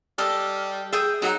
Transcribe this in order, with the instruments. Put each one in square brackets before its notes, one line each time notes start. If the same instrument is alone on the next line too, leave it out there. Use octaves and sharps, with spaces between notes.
[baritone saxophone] G3 [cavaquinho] A4 D#5 [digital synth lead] F6
[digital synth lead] G#4 [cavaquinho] E5 G5 D#6
[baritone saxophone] F#3 [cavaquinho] D#4 F#5